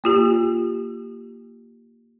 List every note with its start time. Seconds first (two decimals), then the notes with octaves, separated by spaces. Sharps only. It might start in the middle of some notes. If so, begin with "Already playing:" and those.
0.04 A#3 F4 G4